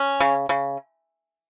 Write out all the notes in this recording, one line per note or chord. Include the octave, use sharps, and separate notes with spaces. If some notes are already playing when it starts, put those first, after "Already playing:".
Already playing: C#4
C#3
C#3